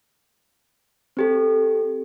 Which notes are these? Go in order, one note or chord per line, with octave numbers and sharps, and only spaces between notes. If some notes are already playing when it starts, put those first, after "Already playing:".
C4 G4 A4